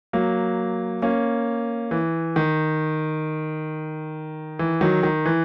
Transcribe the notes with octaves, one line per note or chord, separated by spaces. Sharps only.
F#3 A#3
A#3 C#4
E3
D#3
E3
D#3 F#3
D#3
E3